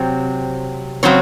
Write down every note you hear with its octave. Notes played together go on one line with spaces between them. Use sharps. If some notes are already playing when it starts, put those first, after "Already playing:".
Already playing: C3 F#3 C4
C#3 F#3 C4 C#5